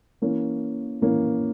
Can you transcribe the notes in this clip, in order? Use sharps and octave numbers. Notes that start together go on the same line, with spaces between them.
E3 A#3 C#4
E3 A#3 C#4